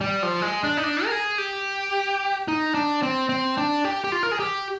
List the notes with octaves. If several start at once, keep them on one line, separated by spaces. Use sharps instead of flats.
G3
F3
G#3
D4
D#4
D4
A#4
G#4
G4
D#4
D4
C4
C4
D4
G4
G4
F4
A#4
G#4
G4